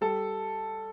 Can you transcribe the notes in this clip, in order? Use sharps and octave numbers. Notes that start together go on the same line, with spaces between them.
G3 A4